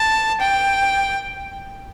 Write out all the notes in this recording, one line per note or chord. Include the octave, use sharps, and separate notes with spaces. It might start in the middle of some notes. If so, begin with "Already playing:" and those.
Already playing: A5
G5